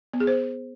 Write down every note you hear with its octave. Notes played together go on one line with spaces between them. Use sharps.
B3
G#4
C5